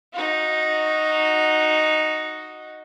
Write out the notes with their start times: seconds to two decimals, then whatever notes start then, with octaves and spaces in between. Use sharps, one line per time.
0.13 D#4 F#4